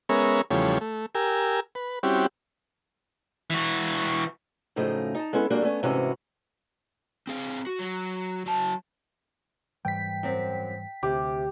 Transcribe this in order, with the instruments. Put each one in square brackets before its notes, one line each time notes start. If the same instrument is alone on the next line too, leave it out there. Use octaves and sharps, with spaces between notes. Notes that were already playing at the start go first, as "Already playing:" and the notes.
[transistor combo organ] G#3 B3 C#4 A#4 C#5 E5
E2 C#3 F3 G3 A3 C#5
A3
G4 A#4 G#5 E6
B4
G3 C4 C#4 E4 F#4 G4
[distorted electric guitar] E3 F#4
[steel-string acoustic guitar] F#2 A2 C#3 F3 A3 D#4
D#4 A5
G#3 B3 C#4 E4 A4
F#3 G#3 A#3 D4 F#4 G4
A3 B3 C#4
G#2 C3 E3 C#4 E4 F#4
[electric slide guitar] C4 G#4 F5
F#4
F#3
F#3 A5
[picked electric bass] G#2 E3 G3 [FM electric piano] G5 B6
[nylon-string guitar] F#2 C4
[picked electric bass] D2 [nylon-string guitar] C3 [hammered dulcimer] G4